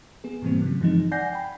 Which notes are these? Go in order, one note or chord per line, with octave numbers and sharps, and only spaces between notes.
B3 G#4
G#2 B2 E3 G3 A#3 C4
C#3 F#3
G2 E3 F3 G#3 C4 D#4
D5 F#5 G#5 G6 A#6 C7
G5 B5